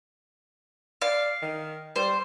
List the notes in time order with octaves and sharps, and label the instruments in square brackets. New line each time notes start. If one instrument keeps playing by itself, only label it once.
[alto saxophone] D5 [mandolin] F5
[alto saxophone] D#3
[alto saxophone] G3 [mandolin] C5